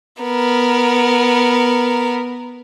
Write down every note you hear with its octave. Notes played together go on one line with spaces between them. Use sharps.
B3 A#4